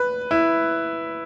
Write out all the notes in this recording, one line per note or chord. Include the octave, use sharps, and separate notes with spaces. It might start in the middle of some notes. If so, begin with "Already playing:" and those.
Already playing: B4
E4